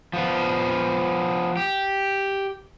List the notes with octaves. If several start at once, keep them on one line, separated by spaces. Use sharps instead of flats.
F3 B3
G4